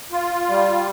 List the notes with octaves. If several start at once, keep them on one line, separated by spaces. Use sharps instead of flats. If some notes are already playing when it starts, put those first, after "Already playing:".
F4
G3